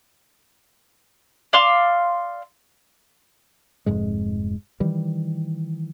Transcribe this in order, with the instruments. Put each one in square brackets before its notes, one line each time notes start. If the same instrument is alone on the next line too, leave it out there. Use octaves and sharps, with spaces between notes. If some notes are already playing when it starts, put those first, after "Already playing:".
[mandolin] D5 F5 C6 E6
[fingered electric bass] F1 F2 G#2 G#3
D#3 E3 G3